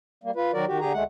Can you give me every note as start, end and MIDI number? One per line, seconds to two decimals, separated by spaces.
0.24 0.31 55
0.24 0.31 58
0.36 0.51 65
0.36 0.51 71
0.53 0.65 51
0.53 0.65 54
0.53 0.65 66
0.53 0.65 70
0.53 0.65 74
0.67 0.80 51
0.67 0.80 66
0.67 0.80 67
0.80 0.93 50
0.80 0.93 67
0.80 0.93 68
0.80 0.93 82
0.93 1.04 38
0.93 1.04 56
0.93 1.04 57
0.93 1.04 78